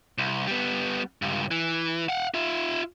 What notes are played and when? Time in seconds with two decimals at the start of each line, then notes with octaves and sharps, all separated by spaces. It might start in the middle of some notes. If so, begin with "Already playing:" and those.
0.18 C2
0.47 G3 B3
1.22 C#2 G2
1.51 E3
2.09 F5 F#5
2.34 F4 E5